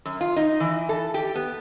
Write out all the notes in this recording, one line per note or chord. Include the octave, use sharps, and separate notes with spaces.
F#2
F4
D#4
E3
A4
G4
B3